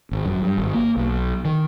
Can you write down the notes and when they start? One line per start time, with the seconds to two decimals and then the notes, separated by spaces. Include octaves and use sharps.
0.11 G#1
0.26 F#2
0.42 G2
0.58 G#1
0.74 A#3
0.97 B1
1.45 D#3